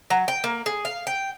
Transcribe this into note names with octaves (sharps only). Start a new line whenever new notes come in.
F#3
G5
A#3
G#4
F5
G5